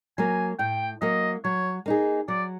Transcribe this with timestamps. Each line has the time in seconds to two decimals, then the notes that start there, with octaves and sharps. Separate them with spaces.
0.18 F#3 A#3 G#5
0.59 A2 G5
1.02 F#3 A#3 D#5
1.44 F#3 C#5
1.86 A#3 D#4 G#4
2.28 F#3 D5